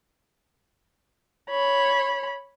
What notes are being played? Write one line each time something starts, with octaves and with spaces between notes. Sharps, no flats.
C#5 B5